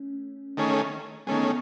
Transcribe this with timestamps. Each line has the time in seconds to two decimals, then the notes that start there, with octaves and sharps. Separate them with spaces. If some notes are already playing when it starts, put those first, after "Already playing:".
Already playing: A3 C#4
0.57 D#3 A3 C#4 G#4
1.27 D#3 G#3 A3 B3 C#4 G#4